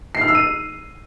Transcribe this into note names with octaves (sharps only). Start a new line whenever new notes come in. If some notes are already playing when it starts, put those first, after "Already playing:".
C7
F6
E6
D#7